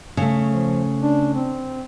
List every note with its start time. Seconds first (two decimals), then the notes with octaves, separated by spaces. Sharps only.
0.17 C#3 A3
0.48 F3
1.02 D4
1.34 C4